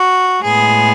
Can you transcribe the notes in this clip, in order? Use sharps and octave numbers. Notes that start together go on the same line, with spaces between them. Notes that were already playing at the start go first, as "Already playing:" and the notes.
Already playing: F#4
A2 G#3 B3 G#4